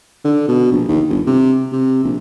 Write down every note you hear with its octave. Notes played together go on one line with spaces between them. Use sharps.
D3
B2
A#1
D#2
G1
C3
C3
A#1